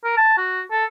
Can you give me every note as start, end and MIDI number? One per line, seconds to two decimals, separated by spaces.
0.04 0.13 70
0.17 0.37 81
0.38 0.61 66
0.71 0.85 69